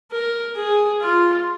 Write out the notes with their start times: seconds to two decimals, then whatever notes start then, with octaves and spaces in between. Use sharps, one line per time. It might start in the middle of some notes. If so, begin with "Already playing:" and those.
0.11 A#4
0.57 G#4
1.01 F4